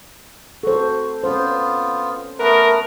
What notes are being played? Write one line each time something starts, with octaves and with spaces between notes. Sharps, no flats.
F#4 A4 C5
B3 C#4 F4 C5
A3 B3 A#4 B4